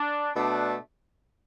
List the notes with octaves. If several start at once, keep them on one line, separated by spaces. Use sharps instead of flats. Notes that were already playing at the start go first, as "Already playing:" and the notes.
Already playing: D4
B2 A3 D4